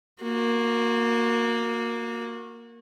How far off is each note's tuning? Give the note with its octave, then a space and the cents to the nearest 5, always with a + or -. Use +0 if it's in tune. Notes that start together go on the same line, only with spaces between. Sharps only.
A#3 +0 F#4 -30